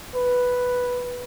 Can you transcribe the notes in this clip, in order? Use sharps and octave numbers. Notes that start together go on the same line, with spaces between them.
B4